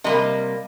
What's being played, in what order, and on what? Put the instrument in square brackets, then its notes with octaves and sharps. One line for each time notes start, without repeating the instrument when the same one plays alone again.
[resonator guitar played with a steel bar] C3 G3 A#3 D#5